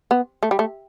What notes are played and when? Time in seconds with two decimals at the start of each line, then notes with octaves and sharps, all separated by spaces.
0.11 B3
0.43 A3
0.51 G3
0.59 A3